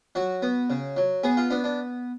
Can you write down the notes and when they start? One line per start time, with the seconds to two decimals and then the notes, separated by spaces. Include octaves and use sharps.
0.15 F#3 F#4
0.42 B3
0.70 C#3
0.97 F#3
1.24 B3 G#4
1.37 F4
1.50 B3 D4
1.64 D4